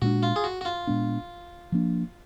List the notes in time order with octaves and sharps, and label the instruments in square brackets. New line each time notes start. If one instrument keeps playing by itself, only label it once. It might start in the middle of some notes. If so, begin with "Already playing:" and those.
[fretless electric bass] A#2 G#3 B3 D4 [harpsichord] F#4
[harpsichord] F4
G#4
F#4
F#4
F4
[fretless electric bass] A#2 G#3 B3 D4
F3 A#3 D4